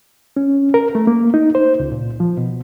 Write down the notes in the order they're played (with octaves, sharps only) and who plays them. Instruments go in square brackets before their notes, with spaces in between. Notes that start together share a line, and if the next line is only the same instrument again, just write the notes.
[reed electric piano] C#4
A#4
A3
A#3
D#4
C5
C#2
A#2
F3
B2